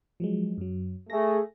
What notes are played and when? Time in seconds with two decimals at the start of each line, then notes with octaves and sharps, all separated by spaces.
0.20 F3 F#3 G#3
0.58 F#2 F#3
1.10 A3 G#4 A#6